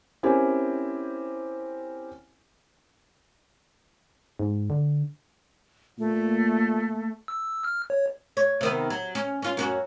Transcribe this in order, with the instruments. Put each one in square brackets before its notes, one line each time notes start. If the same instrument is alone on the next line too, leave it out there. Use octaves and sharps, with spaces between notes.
[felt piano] C4 C#4 E4 G4 A#4 G#5
[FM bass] G#2
D3
[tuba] A#2 [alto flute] A3 [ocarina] A#3
[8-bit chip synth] E6
F6
C#5
[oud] C#5
C3 D#3 B3
F#3
C#4
C#4 F4
F#2 C#4 F#4